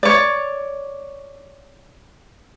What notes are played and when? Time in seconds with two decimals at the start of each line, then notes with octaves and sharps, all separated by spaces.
0.03 C#5 D5